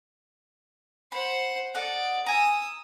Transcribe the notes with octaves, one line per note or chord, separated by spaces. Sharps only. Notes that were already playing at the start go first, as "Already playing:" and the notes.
C5 F#5 B5
A4 D5 D#5 F#5
G#5 A#5 D#6 E6